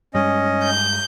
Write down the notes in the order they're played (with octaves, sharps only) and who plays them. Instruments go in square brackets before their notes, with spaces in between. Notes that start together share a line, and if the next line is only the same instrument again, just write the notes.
[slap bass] G2 G3 G#3 [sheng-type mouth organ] C#4 D#5
[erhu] G6